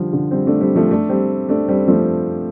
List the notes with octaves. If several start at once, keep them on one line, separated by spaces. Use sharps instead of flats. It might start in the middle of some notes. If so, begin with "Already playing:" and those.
Already playing: D3 F3 G3
D3
G3 C4
A3 D4
G3 C4
F3 A3
A3 D4
G3 C4
A3 D4
G3 C4
F3 A3